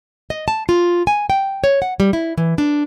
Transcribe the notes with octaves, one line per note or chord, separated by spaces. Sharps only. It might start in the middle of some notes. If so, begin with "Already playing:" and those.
D#5
A5
F4
G#5
G5
C#5
F#5
G3
E4
E3
D4